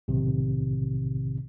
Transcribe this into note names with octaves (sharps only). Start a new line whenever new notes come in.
B1 A2 C3 D#3